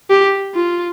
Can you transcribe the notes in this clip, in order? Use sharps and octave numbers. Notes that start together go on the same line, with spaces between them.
G4
F4